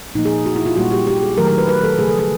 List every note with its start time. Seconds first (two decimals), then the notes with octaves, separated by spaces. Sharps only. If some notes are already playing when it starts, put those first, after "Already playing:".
0.15 A#2 F3 A#3 D#4
0.25 G#4
0.46 F#4
0.56 E4
0.66 F4
0.76 A#2 G3 A#3 F#4
0.92 G4
1.07 G4
1.22 G#4
1.37 D#3 F#3 A3 A#4
1.48 A#4
1.58 B4
1.68 B4
1.84 A4
1.99 C#3 F3 A3 G#4
2.09 A4
2.19 G#4